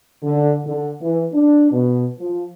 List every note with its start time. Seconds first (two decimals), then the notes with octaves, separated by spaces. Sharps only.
0.23 D3
0.65 D3
1.02 E3
1.33 D4
1.72 B2
2.20 F3